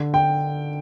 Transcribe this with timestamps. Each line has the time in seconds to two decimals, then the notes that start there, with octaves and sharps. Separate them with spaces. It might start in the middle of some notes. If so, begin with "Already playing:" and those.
Already playing: D3
0.14 G5